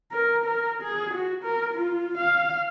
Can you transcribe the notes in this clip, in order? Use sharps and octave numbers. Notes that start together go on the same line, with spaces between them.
A#4
A#4
G#4
F#4
A#4
F4
F5